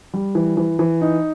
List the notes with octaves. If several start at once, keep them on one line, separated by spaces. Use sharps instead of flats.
G3
E3
E3
E3
D#4